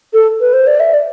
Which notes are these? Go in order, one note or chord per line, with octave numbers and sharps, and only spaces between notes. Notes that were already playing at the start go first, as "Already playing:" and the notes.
A4
B4
C5
D5
E5
D5